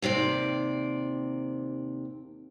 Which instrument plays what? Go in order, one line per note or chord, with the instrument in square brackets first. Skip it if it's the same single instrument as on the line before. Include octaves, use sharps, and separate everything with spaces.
[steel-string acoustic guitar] D#2 C3 C5 D5